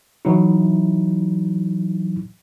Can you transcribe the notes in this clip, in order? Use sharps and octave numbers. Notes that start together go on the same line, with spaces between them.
E3 F#3 D#4 E4